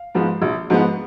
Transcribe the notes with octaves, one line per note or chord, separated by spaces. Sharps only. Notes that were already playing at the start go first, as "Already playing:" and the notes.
Already playing: F5
G#2 F3 B3
A#1
G#2 F3 B3